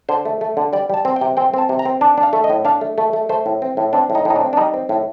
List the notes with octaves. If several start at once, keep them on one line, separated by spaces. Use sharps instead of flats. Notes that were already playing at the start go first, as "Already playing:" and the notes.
D3 C5
A3
A3
D3
G3 D5
G3 A5
C4
G5
C3
C4 G5
C4 A5
C3
A#5
C4
D4 A5
D4
F5
A3
D#5
A2
D4 F5
A3
A3
A3
A3 C5
A2
C4
A2
C4 D4
A2
D#4
A2 D#4
D4
C4
D4
G3 D#4
C4
A2